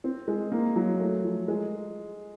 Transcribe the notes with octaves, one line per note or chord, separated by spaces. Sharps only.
C4
G#3
A#3
F#3
A3
F3
G#3